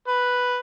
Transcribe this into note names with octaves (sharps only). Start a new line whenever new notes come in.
B4